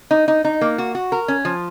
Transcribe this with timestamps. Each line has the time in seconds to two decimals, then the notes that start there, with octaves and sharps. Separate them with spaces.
0.11 D#4
0.28 D#4
0.45 D#4
0.61 A#3
0.78 F#4
0.95 F#4
1.12 A#4
1.28 C#4
1.45 F3